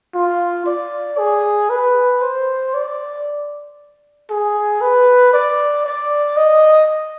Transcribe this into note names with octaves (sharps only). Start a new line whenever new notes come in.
F4
D5
G#4
B4
C5
D5
G#4
B4
D5
D5
D#5